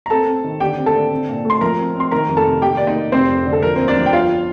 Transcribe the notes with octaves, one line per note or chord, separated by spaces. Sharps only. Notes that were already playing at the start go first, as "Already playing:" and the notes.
A#5
C4 A4 A5
C4
D#3
D3 G4 G5
C4
A4 A5
D3
C4
A#2
A3
C6
F3 A#4 A#5
C4
C4
C6
D#3 A#4 A#5
F2
A4 A5
C3
D#3 G4 G5
A#3 D5
D#4 D#5
A#3
F1 C4 C5
F2
D3
A4
F3 A#4
D#2 C4 C5
D4 D5
F3
G5
G1 F4 F5